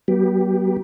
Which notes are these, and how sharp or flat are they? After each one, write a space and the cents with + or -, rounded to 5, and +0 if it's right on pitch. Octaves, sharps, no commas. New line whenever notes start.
F#3 +35 B3 -40 G4 +0